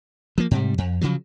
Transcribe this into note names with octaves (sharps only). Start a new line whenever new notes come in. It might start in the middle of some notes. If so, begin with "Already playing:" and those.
F3 A#3
G#2 C3 G3
F2
C#3 F3 F#3